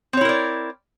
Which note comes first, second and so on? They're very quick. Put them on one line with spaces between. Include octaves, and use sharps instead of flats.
C4 C#5 E4 A#4 D5